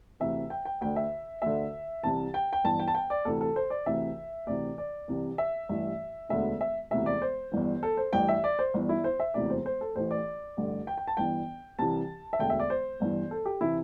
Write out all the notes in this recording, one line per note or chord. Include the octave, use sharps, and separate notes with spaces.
D2 C3 E3 E5
G5
G5
D2 D3 G5
E5
D2 D3 E5
C2 C3 E3 A5
G5
G5
G1 G2 E3 A5
G5
A5
G5
D5
D2 C3 E3 A4
A4
C5
D5
D2 C3 E3 E5
D2 C3 E3 D5
D5
C2 C3 E3
E5
A1 G2 E3
E1 D2 D3 E5
E5
E1 D2 C3 E3 E5
D5
C5
G1 G2 E3
A4
C5
A1 G2 E3 G5
E5
D5
C5
G1 G2 E3
E4
C5
E5
E1 D2 C3 E3 D5
C5
C5
A4
A1 A2 E3 C5
D5
A1 G2 D3
G5
G5
A5
G1 G2 E3 G5
C2 C3 E3 A5
E5
E1 D2 D3 G5
E5
D5
C5
G1 G2 E3
A4
G4
C3 E3 E4